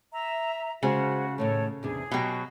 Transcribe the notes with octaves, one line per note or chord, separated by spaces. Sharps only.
E5 A#5
C#3 G#3 F#4 C5
A2 D#3 A3 A4 C#5
E2 C3 D4 G#4
B2 F#3 G4 D#5 G5